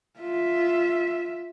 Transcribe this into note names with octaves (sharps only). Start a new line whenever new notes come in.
F4 E5